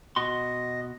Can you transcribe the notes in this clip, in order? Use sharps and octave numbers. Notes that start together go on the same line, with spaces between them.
B2 F#4 D#5 C6